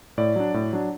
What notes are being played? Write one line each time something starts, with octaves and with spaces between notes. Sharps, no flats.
A2 D5
F#3 D4
A2
F#3 D4